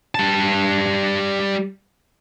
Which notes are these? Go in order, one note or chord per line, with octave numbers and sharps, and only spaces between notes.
G3 A5